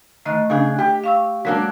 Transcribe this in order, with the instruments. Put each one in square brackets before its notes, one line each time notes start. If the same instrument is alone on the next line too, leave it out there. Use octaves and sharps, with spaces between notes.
[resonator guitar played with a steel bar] D#3 [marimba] A3 D#5 F#6
[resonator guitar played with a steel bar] C#3 D4 G#4
G4
[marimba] F5 C#6 E6
[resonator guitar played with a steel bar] F#3 A#3 D4 [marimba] G#3